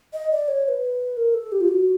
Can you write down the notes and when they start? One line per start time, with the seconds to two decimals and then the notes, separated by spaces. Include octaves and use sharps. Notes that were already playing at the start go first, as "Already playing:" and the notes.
0.13 D#5
0.31 D5
0.48 C#5
0.65 C#5
0.68 B4
1.17 A#4
1.34 A4
1.52 G4
1.61 F4
1.68 F#4